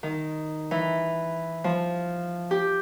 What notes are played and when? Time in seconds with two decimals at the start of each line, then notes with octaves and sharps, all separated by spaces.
0.03 D#3
0.71 E3
1.64 F3
2.51 G4